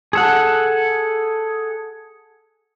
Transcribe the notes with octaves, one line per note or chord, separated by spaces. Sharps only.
G#4 A4 F#5